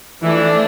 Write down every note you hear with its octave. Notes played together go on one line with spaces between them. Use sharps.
E3 F3 A3 D4 E4